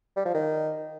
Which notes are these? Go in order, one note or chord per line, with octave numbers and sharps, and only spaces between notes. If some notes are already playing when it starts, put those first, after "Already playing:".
G3
F3
D#3